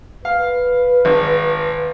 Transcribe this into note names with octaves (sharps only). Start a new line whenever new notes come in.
B4 F5
G#1